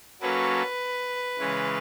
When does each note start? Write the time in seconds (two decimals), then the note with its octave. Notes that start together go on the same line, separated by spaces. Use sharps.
0.21 F#3 A#3 C#4 F#4 A4 B4
1.38 C#3 E3 G#3 C#4